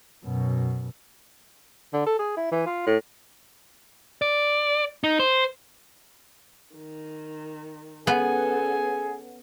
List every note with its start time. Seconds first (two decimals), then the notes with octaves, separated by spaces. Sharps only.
0.25 F#2 B2
1.93 D3
2.06 A4
2.19 G#4
2.37 E4
2.52 E3
2.66 F4
2.87 A2
4.22 D5
5.04 D#4
5.19 C5
6.75 D#3
8.07 B3 C#4 G#4 A4